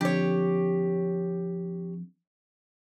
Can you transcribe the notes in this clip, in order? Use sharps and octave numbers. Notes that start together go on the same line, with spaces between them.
F2 D3 G4 C#5